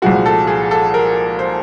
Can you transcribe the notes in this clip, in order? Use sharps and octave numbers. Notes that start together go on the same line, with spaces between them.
C2 A#2 F3 G#3 F#4
A4
G#4
A4
A#4
C5